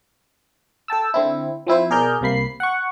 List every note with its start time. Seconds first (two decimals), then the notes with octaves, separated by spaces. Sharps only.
0.88 A4 G5 A5 E6
1.14 D3 C4 E4
1.67 F3 C4 E4 C5
1.90 B2 G#4 A#4 D5 F6 G6
2.21 C2 C3 A#3 B5 C7
2.60 F#5 C#6